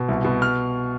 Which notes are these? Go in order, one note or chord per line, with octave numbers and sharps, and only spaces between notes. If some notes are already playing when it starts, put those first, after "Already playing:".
Already playing: B2
C2
B2
F6